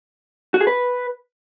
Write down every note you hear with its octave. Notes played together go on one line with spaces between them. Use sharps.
F#4
G#4
B4